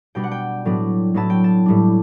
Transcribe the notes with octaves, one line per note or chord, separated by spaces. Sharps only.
B2 G3 D4 G5
F#5
G5
A2 F#3 B3 D4
A2 F#3 B3 E4 A5
G5
A5
A2 G3 D4